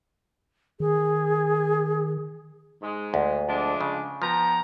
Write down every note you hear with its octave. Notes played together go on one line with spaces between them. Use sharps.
D#3 G#4
G#2 G#3
D2
F3 G#3 D4
C#3
F3 B3 G5 A#5